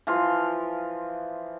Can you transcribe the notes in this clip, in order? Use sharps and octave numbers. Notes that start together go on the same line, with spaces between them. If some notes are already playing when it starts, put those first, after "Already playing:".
E3 F3 F5 C6